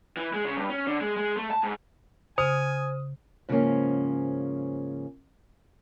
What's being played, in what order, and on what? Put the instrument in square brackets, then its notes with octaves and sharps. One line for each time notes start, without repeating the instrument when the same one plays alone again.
[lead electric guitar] E3
G#3
C#3
G2
C#4
D3
G#3
G#3
A3
A5
G#2
[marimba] C#3 [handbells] C5 [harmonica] G#5 [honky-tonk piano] D#6
[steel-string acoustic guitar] G#2 C#3 F3 G3 A#3 C#4